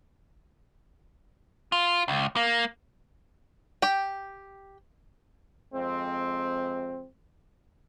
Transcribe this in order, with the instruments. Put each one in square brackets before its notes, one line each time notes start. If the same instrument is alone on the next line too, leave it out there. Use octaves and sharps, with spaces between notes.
[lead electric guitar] F4
C#2
A#3
[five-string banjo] G4 G5
[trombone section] F2 G#3 C4